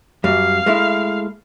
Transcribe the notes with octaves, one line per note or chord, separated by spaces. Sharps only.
F#2 G3 F5
G#3 A3 E4